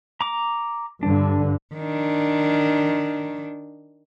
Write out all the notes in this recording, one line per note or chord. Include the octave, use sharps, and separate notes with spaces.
A#5 D6
G2 D3 D4
D#3 D4